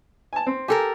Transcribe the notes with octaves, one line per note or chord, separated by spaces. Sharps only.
G#5 A5
C4
G4 A4 A#4 G#5